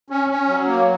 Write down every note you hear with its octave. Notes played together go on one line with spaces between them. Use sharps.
C#4
C#4
F#3
A#3